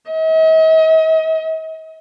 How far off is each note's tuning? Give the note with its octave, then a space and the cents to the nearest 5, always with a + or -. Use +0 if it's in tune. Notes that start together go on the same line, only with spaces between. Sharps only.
D#5 +45